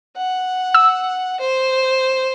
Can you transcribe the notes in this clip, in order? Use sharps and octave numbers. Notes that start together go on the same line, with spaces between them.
F#5
E6
C5